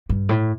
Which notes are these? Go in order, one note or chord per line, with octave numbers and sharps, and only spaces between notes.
G2
A2